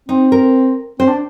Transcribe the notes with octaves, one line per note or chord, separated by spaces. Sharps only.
C4 D#4
A#4
C4 C5
D4